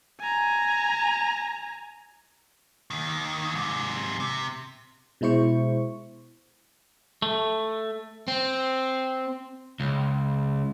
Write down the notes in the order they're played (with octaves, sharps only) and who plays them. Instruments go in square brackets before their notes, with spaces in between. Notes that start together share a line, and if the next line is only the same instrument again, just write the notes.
[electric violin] G#5 A#5
[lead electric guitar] D#2 D#3
G#2 C3
C3
[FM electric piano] B2 G#3 E4 C5 C#6
[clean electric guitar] A3
[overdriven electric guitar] C4
C#2